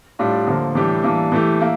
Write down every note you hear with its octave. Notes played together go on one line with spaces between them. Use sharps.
A2 G3 D4 F4
D3 F3 A#3
A2 E3 G3 D4 G4
E3 G3 A#3 D4
E3 A3 E4 G4
A#3 E4